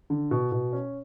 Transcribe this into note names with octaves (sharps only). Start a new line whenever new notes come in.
D3
B2
B2
C#4